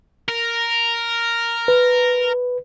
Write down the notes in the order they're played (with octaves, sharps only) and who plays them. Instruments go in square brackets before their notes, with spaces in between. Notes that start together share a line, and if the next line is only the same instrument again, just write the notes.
[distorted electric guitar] A#4
[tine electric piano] B4